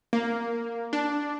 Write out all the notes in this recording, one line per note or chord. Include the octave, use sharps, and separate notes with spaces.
A#3
D4